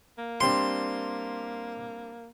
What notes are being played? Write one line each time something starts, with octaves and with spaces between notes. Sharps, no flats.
A#3
G3 C4 D4 C6